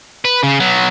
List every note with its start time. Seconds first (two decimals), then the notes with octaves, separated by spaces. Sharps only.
0.25 B4
0.43 C#3
0.60 F#3 B3